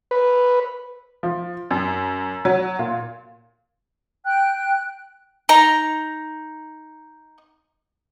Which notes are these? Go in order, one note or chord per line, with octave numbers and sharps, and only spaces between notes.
B4
F3
F#2
F#3
A#2
G5 F#6
D#4 A#5